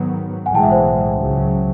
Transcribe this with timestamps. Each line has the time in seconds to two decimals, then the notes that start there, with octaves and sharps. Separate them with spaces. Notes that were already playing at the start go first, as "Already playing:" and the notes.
Already playing: G#2 D#3 F#3 B3
0.46 B1 A2 E3 G#3 F#5 G#5
0.55 G5 A5
0.62 E5 F#5
0.72 C5
1.15 C#2 C#3 F#3